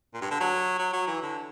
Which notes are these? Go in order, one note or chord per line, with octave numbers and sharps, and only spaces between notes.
A#2
G2
D3
F#3
F#3
F#3
E3
D3